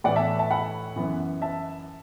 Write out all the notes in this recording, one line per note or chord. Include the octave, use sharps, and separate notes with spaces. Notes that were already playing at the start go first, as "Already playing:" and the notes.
A2 E3 B3 D5 F#5
E5 A5
E5 A5
F#5 B5
F#2 E3 B3
E5 A5